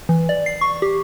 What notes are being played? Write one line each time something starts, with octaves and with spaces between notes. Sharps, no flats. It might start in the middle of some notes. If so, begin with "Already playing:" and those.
E3
D5
C7
C#6
G4